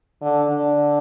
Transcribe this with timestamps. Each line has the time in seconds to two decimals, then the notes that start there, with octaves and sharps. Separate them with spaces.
0.22 D3
0.50 D3